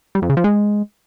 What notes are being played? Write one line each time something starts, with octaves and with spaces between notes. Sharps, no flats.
G3
F2
C#3
F3
G#3